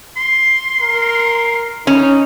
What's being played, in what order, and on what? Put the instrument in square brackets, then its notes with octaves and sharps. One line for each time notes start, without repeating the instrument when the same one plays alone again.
[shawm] C6
[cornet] A#4
[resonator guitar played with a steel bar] C#4 [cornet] D#4